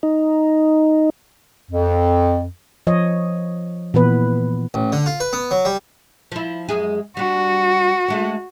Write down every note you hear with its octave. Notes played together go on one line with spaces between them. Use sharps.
D#4
F2
F3 C#5 D#5
A#2 E3 B3 B4
A1
D3
F4
B4
B3
F#3
G3
F3 E4
F#2 G#3 G#4
G3 D4 F#4
G#3 A3 D4